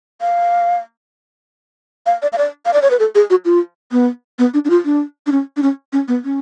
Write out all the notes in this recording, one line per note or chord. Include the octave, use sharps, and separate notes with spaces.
F5
F5
D5
F5
D5
F5
D5
C#5
B4
A4
G#4
F#4
F4
B3
B3
D4
D4
F4
D4
D4
C#4
D4
C#4
C#4
B3
C#4